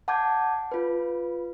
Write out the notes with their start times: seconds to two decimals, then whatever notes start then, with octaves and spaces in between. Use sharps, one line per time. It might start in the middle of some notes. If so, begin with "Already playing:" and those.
0.08 F#5 A5 D6 G6 G#6
0.72 F4 B4